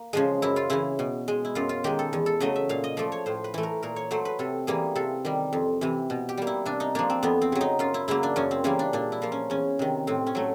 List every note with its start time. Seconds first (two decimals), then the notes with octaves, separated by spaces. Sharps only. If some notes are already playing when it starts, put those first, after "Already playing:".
Already playing: A#3
0.13 C#3 F3 G#3
0.42 F#2 E4
0.56 F4
0.70 C#3 E3 E4
0.99 B2
1.28 G#3
1.45 E4
1.55 F#2 F4
1.69 F4
1.84 D#3 G#3 G4
1.99 A4
2.13 E2
2.26 A4
2.40 C#3 F#3 A3 D#5
2.56 E5
2.69 A#2 F5
2.84 D#5
2.97 F3 A3 D5
3.12 C#5
3.26 A2 C5
3.44 B4
3.54 E3 A3
3.63 A#4
3.83 A#2 A#4
3.96 C#5
4.11 F#3 A3 C5
4.25 B4
4.39 C3 A4
4.67 E3 G3 A#3 G#4
4.95 C3 A4
5.25 D#3 G3
5.53 F2
5.81 C3 E3
6.10 B2
6.29 G4
6.37 G3 A#3
6.47 E4
6.66 C3 D4
6.80 D#4
6.95 F3 A#3 D4
7.10 C4
7.23 F2 B3
7.42 C4
7.52 C#3 F#3
7.61 D#4
7.79 F#2 F4
7.94 E4
8.08 C#3 F#3 A#3 E4
8.23 D4
8.36 F#2 C#4
8.51 C4
8.64 C#3 E3 G3 A#3 C#4
8.79 D4
8.93 A#2 D4
9.12 E4
9.22 F3 A#3
9.32 C#4
9.50 E2 C#4
9.79 C3 D#3
10.07 A2 C4
10.27 C#4
10.35 F#3 A3